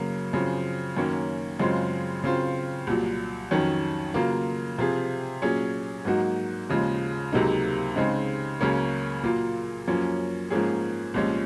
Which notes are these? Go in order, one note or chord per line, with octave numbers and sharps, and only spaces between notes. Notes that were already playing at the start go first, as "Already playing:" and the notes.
Already playing: F#2 C#3 F#3 A#3
F#2 C#3 F3 C4
F#2 D#3 F#3 A#3 C#4
F#2 C#3 G#3 C4 F4
C#3 F#3 C4 F4
C2 A#2 F#3
F2 D#3 F#3 C#4
C#3 F#3 A#3 F4
C3 F3 C4 F4 G#4
A#2 F#3 C#4 G#4
G#2 F#3 A#3 D#4 F#4
D#2 C#3 F3 G#3
C#2 C3 F#3 A#3 D#4
C#3 G#3 C4 D#4
C#2 C#3 F#3 A#3 C#4
A#2 F#3 A#3 F4
F#2 F3 A#3 C#4
G#2 F3 A#3 C#4 G#4
C2 A#2 F3 G#3 C#4